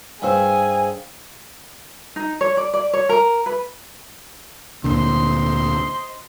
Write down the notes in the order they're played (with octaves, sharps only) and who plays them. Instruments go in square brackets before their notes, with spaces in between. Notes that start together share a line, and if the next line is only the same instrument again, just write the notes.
[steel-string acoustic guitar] G2 C5 [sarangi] G#4 [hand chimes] F5 G5 E6
[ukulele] D#4
C#5
D5
D5
C#5
A#4
B4
[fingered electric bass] D2 A#2 D3 [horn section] C5 D#5 C6